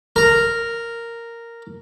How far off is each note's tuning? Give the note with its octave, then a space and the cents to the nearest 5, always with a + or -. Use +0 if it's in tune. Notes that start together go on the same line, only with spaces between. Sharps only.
A#4 -5